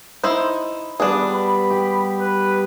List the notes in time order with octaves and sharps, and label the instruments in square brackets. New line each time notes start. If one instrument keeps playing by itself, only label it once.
[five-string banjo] D#4 E4 C5
[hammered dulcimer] G3 B3 [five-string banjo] D4 G#4
[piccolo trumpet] B5
[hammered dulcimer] G4
[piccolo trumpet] B4